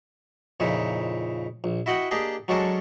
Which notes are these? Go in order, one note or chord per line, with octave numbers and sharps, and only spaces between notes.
F2 A#2 C#3 D#4 E4
A#1
E4 F#4 D#5 F#5 G5
A#3 D4 G4 G#4 D#5
F#3 G#3 C#4 D4 A4 A#4